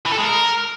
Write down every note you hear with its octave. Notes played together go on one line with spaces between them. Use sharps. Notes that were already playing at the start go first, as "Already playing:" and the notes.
E3
A4
G#3
A#4